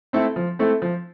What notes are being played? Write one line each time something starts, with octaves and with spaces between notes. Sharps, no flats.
A3 C4 E4 A4
F3
A3 C4 E4 A4
F3